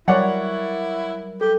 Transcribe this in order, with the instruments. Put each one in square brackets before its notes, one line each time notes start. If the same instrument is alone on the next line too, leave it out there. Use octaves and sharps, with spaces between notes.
[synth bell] F#3 G3 A#4 [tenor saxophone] E4 [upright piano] C#5 D5 F#5
[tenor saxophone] G4 [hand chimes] A4